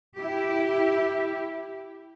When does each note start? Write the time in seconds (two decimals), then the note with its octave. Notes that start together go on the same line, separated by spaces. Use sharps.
0.18 E4 G4